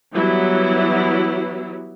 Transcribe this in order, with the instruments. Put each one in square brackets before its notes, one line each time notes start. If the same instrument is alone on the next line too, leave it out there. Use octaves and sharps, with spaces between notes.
[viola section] E3 F#3 G3 B3 E4